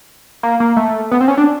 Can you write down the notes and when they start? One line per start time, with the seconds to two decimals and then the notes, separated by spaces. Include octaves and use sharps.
0.43 A#3
0.60 A#3
0.77 A3
1.11 B3
1.21 C4
1.28 C#4
1.37 D4